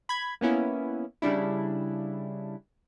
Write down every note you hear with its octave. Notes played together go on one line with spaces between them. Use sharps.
B5 G#6
A#3 B3 C#4 E4
C#3 G3 D4 E4